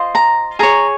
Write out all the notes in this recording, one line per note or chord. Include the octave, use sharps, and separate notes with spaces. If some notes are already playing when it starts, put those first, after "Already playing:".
Already playing: F4 C5 D#5
A#5
G#4 C#5 A#5